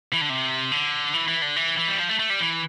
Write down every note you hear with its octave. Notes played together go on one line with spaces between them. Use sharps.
E3
D3
C3
D3
E3
E3
D3
E3
E3
G3
F3
A3
A3
G3
E3